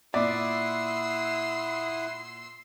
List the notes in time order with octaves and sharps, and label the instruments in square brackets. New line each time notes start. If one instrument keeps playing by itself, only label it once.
[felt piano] A#2 E5 [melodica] E4 F#5 D#6 [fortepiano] D5 [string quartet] C6 E6